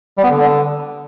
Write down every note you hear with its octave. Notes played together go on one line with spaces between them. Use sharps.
G3
B3
D3